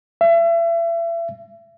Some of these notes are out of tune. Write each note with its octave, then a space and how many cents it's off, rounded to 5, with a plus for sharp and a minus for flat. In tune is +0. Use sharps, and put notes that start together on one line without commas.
E5 +35